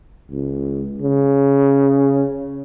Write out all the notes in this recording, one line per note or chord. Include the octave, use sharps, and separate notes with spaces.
C#2
C#3